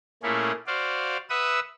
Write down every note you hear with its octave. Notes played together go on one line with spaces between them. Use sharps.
A#2 A3 A#3 C#4 E4 G#4
F#4 C5 D5 F5
B4 E5 F#5 D#6 E6